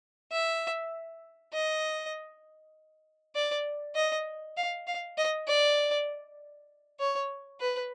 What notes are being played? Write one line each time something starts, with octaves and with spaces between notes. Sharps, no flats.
E5
D#5
D5
D#5
F5
F5
D#5
D5
C#5
B4